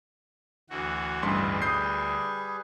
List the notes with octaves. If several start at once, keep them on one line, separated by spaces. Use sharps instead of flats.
D2 E3 F#4
A1 D2 G2 G3 G#4 B4 C6
D#6 G6 C7